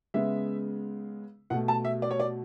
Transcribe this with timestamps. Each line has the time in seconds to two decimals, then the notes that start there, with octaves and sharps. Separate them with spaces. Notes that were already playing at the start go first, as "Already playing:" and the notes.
0.14 C#3 G#3 B3 E5
1.50 B2 A3 F#5
1.68 A5
1.85 E5
2.02 D5
2.11 C#5
2.20 D5